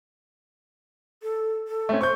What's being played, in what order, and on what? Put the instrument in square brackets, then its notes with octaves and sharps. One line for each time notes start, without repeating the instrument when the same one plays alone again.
[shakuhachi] A4
A4
[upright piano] A3 C4 C#4
[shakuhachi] C5 [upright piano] C#6 G6